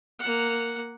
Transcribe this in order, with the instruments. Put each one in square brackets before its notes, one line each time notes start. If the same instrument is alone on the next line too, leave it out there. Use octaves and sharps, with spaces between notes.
[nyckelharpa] A#3 F#5